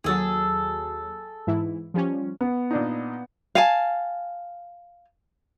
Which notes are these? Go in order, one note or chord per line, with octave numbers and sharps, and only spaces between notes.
D#2 F#3 G#4 A4
G#2 E3 E4
F3 G3 C#4
B3
A#2 D4 D#4
F5 G#5 A5